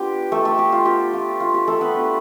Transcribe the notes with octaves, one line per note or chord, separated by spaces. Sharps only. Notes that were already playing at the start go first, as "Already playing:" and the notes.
Already playing: B3 D4 F4 G4
A3 A4
A3 A4
G4
F4
B3 F4 G4
F4
F4
G4
A3 A4
B3 B4
A3 D4 F4